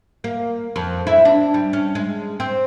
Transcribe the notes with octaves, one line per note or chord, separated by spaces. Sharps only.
A#3
F2
E4
D4
G3
C#4
G#3
C4